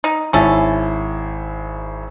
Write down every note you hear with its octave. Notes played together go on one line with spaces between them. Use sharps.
D#4
G#1 C#4 E4 A4